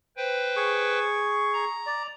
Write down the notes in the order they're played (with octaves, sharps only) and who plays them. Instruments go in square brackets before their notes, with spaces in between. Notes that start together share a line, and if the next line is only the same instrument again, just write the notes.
[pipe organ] B4 C5 G5
[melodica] G#4 C#6
[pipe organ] A#5
[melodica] D5